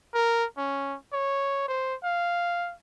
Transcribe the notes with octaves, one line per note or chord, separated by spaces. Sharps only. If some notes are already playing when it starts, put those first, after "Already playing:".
A#4
C#4
C#5
C5
F5